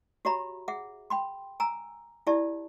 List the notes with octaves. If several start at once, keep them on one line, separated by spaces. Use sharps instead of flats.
F#4 G4 C#5 E5 A#5 B5
G#4 E5 F#5
G5 B5 C6
G#5 A#5 E6
E4 G4 D5 E5 A5